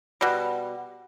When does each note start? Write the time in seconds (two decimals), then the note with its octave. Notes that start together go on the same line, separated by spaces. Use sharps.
0.21 B2 G3